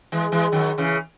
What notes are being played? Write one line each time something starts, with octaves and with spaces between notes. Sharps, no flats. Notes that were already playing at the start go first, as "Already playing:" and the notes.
E3 G#3
E3 G#3
D#3 F#3
C#3 E3